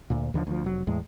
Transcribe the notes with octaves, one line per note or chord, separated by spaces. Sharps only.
D2 A#2
D#2 D3 E3 F3
D2 F3
F1 F#3
E2 A2 G#3